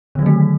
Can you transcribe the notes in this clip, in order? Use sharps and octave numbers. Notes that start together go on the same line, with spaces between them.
D3 D#3 F#3 A3